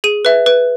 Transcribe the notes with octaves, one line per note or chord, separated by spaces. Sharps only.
G#4 D#7
B4 E5
B4